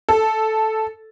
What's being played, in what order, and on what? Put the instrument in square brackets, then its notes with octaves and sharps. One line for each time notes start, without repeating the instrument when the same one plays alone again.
[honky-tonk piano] A4